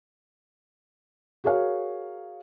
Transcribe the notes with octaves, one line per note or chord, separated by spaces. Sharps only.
F#4 G#4 A#4 C#5 F5